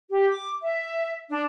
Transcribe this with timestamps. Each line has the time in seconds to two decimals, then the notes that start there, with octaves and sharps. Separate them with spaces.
0.10 G4
0.30 D6
0.62 E5
1.30 D4